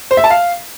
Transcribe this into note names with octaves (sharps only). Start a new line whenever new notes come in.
C5
E5
A5
F5